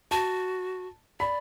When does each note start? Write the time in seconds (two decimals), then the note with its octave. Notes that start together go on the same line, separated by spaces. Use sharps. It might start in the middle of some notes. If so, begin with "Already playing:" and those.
0.11 F#4 A5
1.20 D5 B5